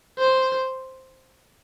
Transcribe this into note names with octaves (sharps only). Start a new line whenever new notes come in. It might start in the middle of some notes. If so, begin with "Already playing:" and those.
C5